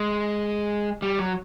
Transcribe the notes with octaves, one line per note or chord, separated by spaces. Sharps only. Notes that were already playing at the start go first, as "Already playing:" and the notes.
Already playing: G#3
G3
F#3